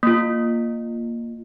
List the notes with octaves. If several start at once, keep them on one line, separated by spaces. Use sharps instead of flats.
A#3 F4